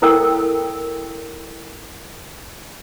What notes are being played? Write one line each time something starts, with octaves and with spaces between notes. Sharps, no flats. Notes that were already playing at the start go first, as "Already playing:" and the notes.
E4 A4 A#4 G5 E6